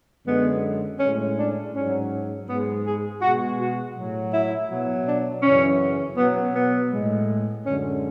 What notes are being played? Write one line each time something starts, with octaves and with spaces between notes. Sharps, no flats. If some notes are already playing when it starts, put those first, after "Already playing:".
F#2 D3 G#3 B3
A2 G#3 C#4
D4
G#2 F#3 C#4
G#2 G#3 B3
G#4
B2 G#3 F#4
F#4
A2 F#3
E4
B2 F#3
D4
F#2 C#3 E3 C#4
B2 F#3 B3
B3
A2 G#3
F#2 D3 G#3 C#4